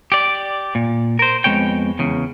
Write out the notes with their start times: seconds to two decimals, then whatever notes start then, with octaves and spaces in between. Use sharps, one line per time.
0.12 G4 D5
0.75 A#2
1.19 A#4 C5
1.44 F2 G#2 G#3 B3 C#5 G5
1.99 E2 C#3